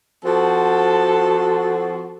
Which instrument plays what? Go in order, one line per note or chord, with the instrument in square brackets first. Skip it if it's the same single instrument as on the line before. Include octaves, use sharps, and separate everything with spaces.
[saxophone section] F3 C4 F#4 [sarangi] A4